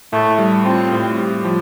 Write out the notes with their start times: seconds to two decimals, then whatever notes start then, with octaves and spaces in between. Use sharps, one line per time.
0.13 A2 A3
0.38 G3
0.65 C4 F4
0.92 A2
1.18 G4
1.45 F3